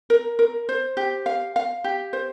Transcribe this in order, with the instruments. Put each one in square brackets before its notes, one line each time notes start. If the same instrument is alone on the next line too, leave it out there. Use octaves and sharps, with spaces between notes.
[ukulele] A#4
A#4
C5
G4
F5
F5
G4
C5